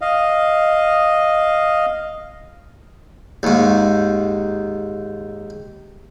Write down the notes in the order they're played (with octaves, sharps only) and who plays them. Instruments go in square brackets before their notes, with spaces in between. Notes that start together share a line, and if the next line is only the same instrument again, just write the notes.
[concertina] D#5 F5
[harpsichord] D#2 G#2